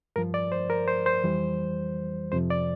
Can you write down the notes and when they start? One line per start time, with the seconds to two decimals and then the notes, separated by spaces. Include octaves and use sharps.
0.16 G2 F3 A#4
0.34 D5
0.52 C5
0.70 A#4
0.88 C5
1.06 C5
1.24 F2 E3 G3
2.32 F2 C3 F3 C5
2.50 D5